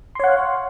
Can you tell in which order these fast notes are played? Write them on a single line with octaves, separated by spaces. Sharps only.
C6 C#5 F#5 F5